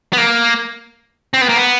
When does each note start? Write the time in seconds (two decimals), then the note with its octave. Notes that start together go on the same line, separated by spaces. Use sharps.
0.13 B3
0.18 A#3
1.34 C4
1.41 B3
1.49 A#3
1.56 B3